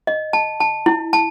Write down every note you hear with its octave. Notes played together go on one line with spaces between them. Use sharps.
D#5
A5
A5
E4
A5